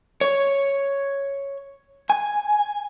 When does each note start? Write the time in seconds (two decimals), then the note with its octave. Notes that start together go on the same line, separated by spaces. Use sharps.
0.21 C#5
2.10 G#5